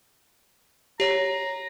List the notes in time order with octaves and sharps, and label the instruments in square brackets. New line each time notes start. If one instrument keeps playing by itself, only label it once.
[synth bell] G4 C#5 [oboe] A#5